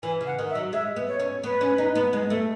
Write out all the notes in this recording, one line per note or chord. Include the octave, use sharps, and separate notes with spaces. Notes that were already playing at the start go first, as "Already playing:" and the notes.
E3 G#5
C#3
F#5
D#3
E5
F#3
G#3 E5
B3
C#5
C#4
B3 B4
C#4
D#4
B3
G#3
A3